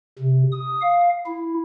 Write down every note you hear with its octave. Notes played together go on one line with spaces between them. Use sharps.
C3
D#6
F5
E4